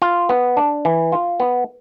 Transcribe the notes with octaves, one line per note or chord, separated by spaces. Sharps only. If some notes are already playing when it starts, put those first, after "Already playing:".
F4
B3
D4
E3
F4
B3